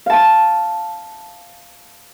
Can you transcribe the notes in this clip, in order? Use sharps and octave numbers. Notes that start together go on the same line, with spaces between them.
F5 A5